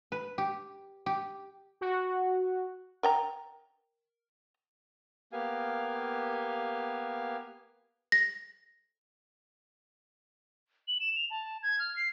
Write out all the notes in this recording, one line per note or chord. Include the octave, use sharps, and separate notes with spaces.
B4
G4
G4
F#4
A#4 G5 A#5
A#3 B3 G4 F5 G#5
A#6
F#7
E7
F7
A5
G#6
F6
C7